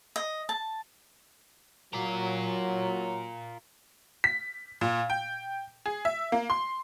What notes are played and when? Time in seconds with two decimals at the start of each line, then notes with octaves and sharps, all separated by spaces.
0.16 D#5
0.49 A5
1.93 F#3 F4 A#4
4.24 B6
4.81 A#2
5.10 G5
5.86 G#4
6.05 E5
6.32 A#3
6.50 C6